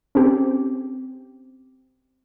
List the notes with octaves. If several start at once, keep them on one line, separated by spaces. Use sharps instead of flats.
C4 C#4 G4